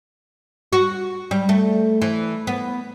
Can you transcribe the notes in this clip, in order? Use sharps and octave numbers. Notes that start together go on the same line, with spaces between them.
F#4
G3
A3
E3
B3